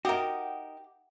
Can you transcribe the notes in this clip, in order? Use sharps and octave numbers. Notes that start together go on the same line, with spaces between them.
D#4 F#4 G4 A#4 E5 F#5 G5 D#6